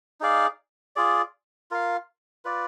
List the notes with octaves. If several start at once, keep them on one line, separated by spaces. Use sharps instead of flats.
D#4 G#4 D5 F5
F4 G#4 D5
F4 A#4 F5
F4 B4 D5